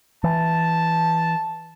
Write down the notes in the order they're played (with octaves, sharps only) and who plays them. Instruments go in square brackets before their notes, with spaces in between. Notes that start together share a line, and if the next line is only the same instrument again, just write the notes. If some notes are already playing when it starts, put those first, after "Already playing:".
[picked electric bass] E3 [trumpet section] A5